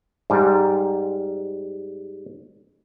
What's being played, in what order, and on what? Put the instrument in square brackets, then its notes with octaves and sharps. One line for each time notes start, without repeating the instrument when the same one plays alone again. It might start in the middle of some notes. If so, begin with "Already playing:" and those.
[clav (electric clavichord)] G#2 G3